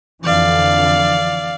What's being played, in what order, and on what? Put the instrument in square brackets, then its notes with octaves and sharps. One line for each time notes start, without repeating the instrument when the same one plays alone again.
[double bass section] F2 D3 E3 [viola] D5 F5